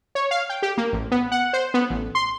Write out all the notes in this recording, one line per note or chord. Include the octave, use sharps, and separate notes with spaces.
C#5
F5
G5
G4
A#3
A1
B3
F#5
C5
B3
A1
C6